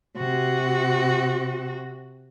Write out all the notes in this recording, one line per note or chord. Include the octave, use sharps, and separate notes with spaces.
C3 F#4